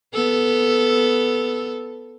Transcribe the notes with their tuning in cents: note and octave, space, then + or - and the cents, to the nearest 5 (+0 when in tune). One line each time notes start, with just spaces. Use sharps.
B3 +0 A4 +0